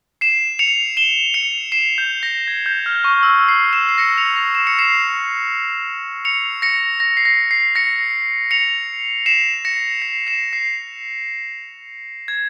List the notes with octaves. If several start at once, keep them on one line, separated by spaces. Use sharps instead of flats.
C7 E7
C#7 F7
E7 G7
C#7 F7
C7 E7
G6
A#6
G#6
G6
F6
C#6
E6
C7
C7 E7
C7
A#6 C#7
C#7 F7
A#6
E7
C#7
C7 E7
C#7 F7
A#6 C#7
A#6
C7
A#6
C7
A#6 C#7
C#7 F7
C7 E7
A#6 C#7
C7
C7 E7
C7
G#6